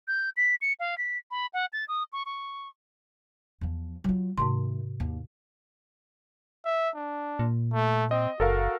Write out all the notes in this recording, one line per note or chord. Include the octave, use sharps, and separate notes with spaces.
G6
B6
C#7
F5
B6
B5
F#5
A6
D#6
C#6
C#6
E2 F3
F#3 F4
G#2 C3 D#3 A3 C6
D#2
E5
D4
A#2
A3
C4 D#5
F#1 F#4 A4 A#4 F5